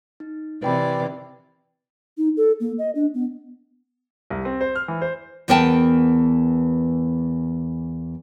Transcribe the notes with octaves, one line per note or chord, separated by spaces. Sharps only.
D#4
C3 E3 B4 D5 G5 B5
D#4
A4
A#3
D#5
D4
B3
C2
C4
C5
F6
E3
C5
E2 E3 B3 A#4 G5 A5